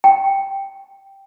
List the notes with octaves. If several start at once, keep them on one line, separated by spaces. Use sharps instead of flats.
G5